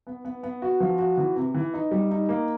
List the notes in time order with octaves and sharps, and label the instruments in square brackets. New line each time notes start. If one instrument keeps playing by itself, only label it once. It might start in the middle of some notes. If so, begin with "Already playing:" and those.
[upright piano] B3
B3
B3
F#4
F3
F#4
E3
C3
E3
D#4
G3
D#4
A#3